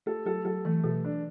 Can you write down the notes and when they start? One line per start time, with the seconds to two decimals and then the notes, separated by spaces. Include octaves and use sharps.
0.06 A3 A4
0.26 F#3 A4
0.45 F#3 A4
0.65 E3 A3
0.84 B2 A4
1.04 D4